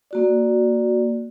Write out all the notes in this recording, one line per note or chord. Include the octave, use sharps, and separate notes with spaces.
A#3 F#4 D5